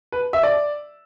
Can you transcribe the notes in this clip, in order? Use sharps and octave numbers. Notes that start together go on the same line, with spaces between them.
B4
E5
D5